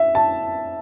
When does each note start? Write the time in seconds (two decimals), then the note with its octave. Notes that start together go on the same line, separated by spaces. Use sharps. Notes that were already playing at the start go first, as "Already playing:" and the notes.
Already playing: E5
0.15 A5